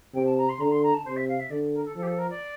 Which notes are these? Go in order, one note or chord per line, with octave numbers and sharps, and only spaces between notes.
C3 G5
A5
A#5
C6
D3 A#5
C6
A#5
A5
C3 C5
E5
F5
E5
D3 D5
A#4
A4
F3 A4
G4
A4
A#4
D5